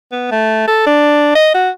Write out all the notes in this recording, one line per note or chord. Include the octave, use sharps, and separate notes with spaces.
B3
A3
A4
D4
D#5
F#4